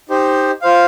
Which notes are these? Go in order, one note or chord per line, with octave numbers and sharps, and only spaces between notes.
D#4 G4 C5
F4 C5 F5